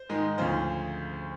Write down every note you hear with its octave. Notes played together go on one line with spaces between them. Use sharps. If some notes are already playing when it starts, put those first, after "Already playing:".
Already playing: C5
G#2 D#3 G#3
D2 C#3 F3 C5